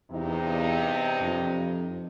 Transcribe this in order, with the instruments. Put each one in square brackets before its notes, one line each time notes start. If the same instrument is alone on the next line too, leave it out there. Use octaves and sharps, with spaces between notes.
[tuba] E2 [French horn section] G2 C3 D#4
[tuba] F2